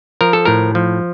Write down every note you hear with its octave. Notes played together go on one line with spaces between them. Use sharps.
F3 A#4
A4
A2 A#4
F3